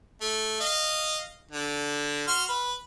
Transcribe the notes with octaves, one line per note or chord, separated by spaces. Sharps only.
A3
D#5 F5
D3
F#4 C6 F6
B4